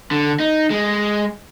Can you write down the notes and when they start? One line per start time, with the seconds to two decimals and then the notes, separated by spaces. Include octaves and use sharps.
0.11 D3
0.40 D#4
0.70 G#3